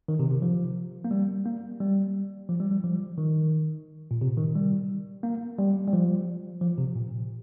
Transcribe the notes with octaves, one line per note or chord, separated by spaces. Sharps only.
D#3
C3
C3
F3
A#3
G3
A#3
G3
F3
G3
G3
F3
D#3
A#2
C3
D#3
G3
A#3
G3
G3
F3
F3
C3
A#2